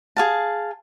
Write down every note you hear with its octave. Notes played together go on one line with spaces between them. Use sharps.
G#4 F5 A5